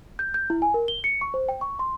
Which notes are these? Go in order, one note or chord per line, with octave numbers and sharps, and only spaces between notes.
G6
G6
E4
G#5
A#4
G7
C#7
C#6
C5
G5
C#6
C6